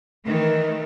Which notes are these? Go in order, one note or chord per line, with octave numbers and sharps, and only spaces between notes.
D#3 E3 A3